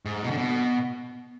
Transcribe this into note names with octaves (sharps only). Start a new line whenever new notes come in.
G#2
B2
D3
B2